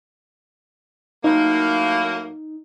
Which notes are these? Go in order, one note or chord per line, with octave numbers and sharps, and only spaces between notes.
A2 F#3 A#3 D#4